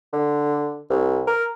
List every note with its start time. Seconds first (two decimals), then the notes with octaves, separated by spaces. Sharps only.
0.13 D3
0.90 C2
1.27 A#4